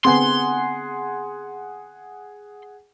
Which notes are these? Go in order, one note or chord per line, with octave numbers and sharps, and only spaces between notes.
D3 B3 C4 G#4 F#5 G#5 C6